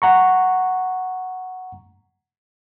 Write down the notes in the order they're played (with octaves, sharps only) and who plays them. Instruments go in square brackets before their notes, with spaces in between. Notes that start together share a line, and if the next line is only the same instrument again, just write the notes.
[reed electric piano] F#5 A#5 C#6